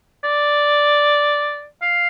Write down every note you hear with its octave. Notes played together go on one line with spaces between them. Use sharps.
D5
F5